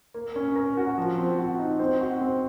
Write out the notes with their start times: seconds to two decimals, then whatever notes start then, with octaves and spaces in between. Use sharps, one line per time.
0.14 A#3
0.36 C#4
0.56 A#4
0.77 F#4
0.98 F3
1.18 C4
1.39 F#4
1.59 D#4
1.79 C4
2.01 F#4
2.21 C4